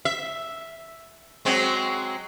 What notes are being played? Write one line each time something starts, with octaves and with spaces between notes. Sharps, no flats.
E5
F#3 G#3 C4